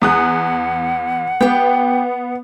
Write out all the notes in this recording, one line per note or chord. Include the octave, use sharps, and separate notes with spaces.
E2 F#5 D#6 F#6
B3 G4 G5